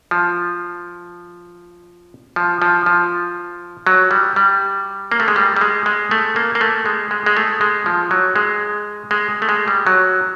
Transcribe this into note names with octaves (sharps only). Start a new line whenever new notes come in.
F3
F3
F3
F3
F#3
G3
G3
A#3
A3
G#3
G3
G3
G#3
G#3
A3
A#3
A#3
A3
G#3
G#3
G#3
A3
G#3
F3
F#3
G#3
G#3
A3
G#3
G3
F#3